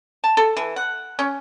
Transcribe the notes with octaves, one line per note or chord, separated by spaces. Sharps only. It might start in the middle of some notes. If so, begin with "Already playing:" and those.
A5
A4
E3
F#5
C#4